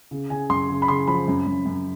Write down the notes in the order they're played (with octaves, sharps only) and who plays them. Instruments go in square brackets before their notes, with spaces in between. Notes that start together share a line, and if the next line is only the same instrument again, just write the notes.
[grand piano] C#3
C#3 G#5
F#2 C6
C#3
B5
C#3 C6
F3 B5
F#2
F#2
F#2